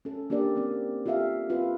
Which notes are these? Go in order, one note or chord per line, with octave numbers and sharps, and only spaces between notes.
C#4 A4
A#3 D4 G4 A#4 D5
A#3 C4
F4 G4 A4 E5 F5
C4 F4 B4